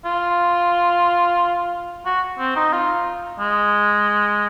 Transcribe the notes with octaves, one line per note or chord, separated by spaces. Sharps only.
F4
F#4
C4
D#4
F4
G#3